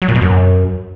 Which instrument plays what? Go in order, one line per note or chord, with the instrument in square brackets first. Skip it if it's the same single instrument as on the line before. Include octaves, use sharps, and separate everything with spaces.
[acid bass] F#3
A#2
B2
F#2